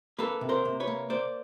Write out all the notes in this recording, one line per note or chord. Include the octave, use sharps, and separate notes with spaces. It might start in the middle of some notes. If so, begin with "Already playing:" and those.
A#3 A4 B4
C3
A#4 C5
C3
B4 C#5
A#3
A#3 C5 D5